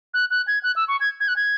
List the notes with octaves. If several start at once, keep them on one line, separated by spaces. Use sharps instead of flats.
F#6
F#6
G#6
F#6
E6
C#6
G#6
G#6
F#6
G#6